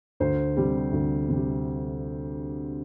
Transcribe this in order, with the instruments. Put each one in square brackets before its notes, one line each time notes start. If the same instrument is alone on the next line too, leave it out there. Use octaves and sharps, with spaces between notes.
[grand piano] D2 C5
C3 G3
D2
C3 G3